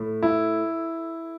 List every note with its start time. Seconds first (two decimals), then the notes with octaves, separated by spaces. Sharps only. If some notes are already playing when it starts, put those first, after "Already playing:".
Already playing: A2
0.23 E4